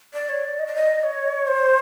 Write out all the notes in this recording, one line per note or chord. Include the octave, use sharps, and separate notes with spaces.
D5
C#5
D5
D#5
D5
D#5
C#5
C5